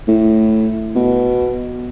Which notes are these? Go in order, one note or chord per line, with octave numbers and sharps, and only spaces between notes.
A2
B2